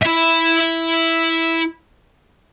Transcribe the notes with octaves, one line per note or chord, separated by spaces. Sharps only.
E4 E5